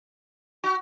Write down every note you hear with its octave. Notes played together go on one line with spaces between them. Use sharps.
F#4